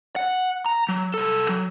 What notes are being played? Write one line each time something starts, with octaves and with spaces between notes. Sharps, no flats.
F#5
A#5
F#3
C2 A4
F#3